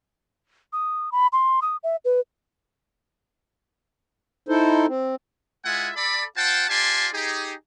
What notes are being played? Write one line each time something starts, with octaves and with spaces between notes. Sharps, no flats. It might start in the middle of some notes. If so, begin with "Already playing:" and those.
D#6
B5
C6
D#6
E5
B4
D#4 E4 A4 C5
C4
G#3 E4 F4 E5 F#5 G#5
A4 D5 B5
F4 C5 F#5 G5 A5
F4 G4 D5 G#5 A5 C6
D#4 G4 G#4